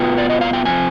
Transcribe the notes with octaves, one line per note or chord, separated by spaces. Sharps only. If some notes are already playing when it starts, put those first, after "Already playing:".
Already playing: B2 B3 F4 G5
D5
D#5
F5
G5
C3 F3 G#5